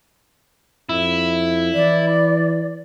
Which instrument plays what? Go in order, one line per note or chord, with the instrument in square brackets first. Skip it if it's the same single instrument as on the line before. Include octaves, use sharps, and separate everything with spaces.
[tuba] F2 [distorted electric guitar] E4
[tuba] E3 [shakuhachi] D5